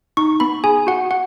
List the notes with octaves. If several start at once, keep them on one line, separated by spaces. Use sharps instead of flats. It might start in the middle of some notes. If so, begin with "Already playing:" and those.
D#4 C#6
B3 B5
G#4 G#5
F#4 F#5
F#4 F#5